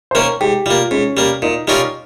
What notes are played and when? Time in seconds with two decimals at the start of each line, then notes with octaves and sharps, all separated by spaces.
0.11 C5
0.15 D#3 A#3 C#4 A#4
0.41 G#2 G4
0.66 G3 A#3 F4
0.91 G#2 C#4
1.17 G3 A#3
1.42 A#2 D#4
1.68 G3 C#4 D#4 F4 A#4